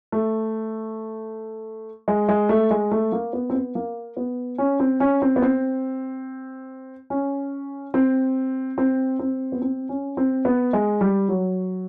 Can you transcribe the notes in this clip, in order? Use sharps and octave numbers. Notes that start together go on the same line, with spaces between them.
A3
G#3
G#3
A3
G#3
A3
A#3
B3
C4
B3
A#3
B3
C#4
C4
C#4
C4
B3
C4
C#4
C4
C4
C4
B3
C4
C#4
C4
B3
G#3
G3
F#3